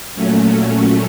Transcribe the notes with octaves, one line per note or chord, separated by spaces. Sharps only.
A#2 F#3 A3 C#4